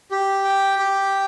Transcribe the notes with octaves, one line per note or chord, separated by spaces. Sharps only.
G4
G5
G4